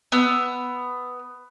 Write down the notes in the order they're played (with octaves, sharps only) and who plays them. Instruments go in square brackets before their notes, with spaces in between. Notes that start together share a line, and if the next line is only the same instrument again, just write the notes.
[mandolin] B3 E6